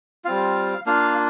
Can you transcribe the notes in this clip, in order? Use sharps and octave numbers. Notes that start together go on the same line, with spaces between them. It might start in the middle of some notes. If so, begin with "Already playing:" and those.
G3 C4 F4 F5
A#3 D4 F4 F5